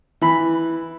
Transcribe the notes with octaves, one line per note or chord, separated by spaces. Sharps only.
E3 B5